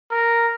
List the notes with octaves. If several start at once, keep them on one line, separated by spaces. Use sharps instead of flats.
A#4